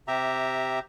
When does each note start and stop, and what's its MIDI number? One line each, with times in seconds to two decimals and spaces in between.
0.08 0.79 48
0.08 0.79 67
0.08 0.79 76
0.08 0.79 82